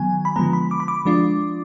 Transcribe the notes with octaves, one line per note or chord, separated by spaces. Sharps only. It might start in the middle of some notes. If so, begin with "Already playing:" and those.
Already playing: D#3 F#3 B3 G#5
B5
D3 F3 G#3 B3 A#5
B5
D6
B5
D6
F3 G#3 D4 F4